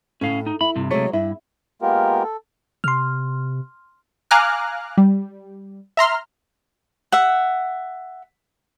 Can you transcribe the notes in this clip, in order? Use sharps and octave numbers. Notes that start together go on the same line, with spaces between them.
A2 C#4 F5
D#4
E4 B5
G2 C3
C3 F#3 G#3 A3 C#5
G2 E4
G#3 A#3 B3 F4 G4 A#4
A4
C3 C6 F6
F5 G#5 A#5 D6 F6 F#6
G3
E5 A#5 C6 F6
E5 F#5